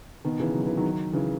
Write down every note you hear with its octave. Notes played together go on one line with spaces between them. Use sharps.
B2 D#3
C#3 E3
F#3
E3
D#3 F#3
C#3 E3